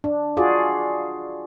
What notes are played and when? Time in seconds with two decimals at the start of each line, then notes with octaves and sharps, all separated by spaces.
0.04 D4
0.37 F4 F#4 G#4 D5